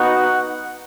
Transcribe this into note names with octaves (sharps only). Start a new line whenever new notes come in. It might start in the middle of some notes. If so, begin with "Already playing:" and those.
Already playing: B3 D#4 F#4 F#5